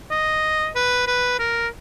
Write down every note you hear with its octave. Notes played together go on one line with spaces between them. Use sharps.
D#5
B4
B4
A#4